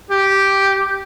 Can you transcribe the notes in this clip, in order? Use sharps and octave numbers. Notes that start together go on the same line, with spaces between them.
G4